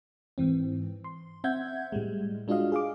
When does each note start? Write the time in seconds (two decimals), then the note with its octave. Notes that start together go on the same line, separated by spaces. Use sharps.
0.38 G#2 E3 C4
1.04 C6
1.44 C4 E5 F#5 G6 G#6
1.92 A2 G3 G#3
2.48 G#3 D4 F4 F#4 D#5 F5
2.72 G#4 F5 D6